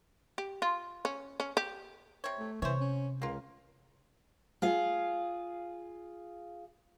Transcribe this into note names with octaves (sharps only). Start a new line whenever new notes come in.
G4
F4
C#4
C#4
G4
C3 C#5
A3
C3 E3 C5 C#5
C#4
C#2 A#3 F4
F4 G#4 F5